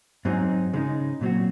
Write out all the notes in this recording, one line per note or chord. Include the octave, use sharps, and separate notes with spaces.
G#2 F#3 C4 D#4 G#4
C#3 G#3 D#4
A#2 F#3 C4 F#4